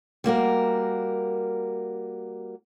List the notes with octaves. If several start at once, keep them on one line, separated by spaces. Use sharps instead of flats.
G3 A#3 F#4 A#4